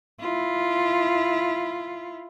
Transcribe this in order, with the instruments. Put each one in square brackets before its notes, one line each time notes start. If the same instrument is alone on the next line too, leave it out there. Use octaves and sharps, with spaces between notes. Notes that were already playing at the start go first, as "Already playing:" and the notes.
[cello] E4 F4